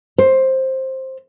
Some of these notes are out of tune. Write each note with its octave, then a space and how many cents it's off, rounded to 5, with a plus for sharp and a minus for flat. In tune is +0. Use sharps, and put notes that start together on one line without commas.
C5 +10